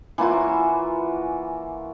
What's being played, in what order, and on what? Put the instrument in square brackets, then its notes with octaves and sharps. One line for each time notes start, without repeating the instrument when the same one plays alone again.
[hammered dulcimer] E3 A#3 F4 F#4